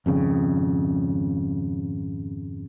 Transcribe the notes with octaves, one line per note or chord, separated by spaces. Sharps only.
G#1 F2 C#3